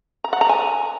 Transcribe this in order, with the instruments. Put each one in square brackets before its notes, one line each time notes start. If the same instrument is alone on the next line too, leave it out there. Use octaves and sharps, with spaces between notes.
[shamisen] A#5
F#5
A#5
G#5